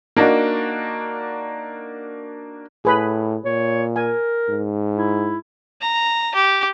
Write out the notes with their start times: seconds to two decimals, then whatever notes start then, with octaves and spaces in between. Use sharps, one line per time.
0.16 A#3 D4 D#4 F#4
2.85 A2 G#4 B4 B5
3.45 A#2 C#5
3.96 A#4 G#5
4.50 G#2
4.97 E4
5.81 A#5
6.35 G4